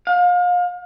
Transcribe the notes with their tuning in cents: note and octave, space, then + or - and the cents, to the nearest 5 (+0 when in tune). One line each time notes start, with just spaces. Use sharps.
F5 +35